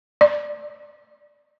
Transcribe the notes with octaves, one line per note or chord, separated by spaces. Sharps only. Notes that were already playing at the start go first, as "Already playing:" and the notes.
D5